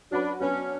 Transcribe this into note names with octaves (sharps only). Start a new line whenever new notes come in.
F#3 C#4 D4 F#4 B4
F#3 B3 C#4 D4 F#4